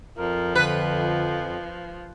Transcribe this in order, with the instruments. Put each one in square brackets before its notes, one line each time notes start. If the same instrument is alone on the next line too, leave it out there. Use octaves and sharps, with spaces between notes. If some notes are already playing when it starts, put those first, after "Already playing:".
[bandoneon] F2 [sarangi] F3 [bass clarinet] A#4
[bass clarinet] D3 [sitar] B4